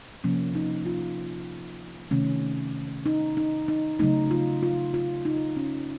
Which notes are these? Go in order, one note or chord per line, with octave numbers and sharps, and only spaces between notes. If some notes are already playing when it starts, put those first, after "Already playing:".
C3 F3 A#3 C#4
D#4
F4
C3 D#3 A3 C#4
D#4
D#4
D#4
C#3 F#3 A3 D#4
F4
F4
F4
D#4
C#4